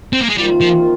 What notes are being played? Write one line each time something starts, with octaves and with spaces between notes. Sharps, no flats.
C4
A#3
G#3
C3 D#3 G3 A#3 F4
F3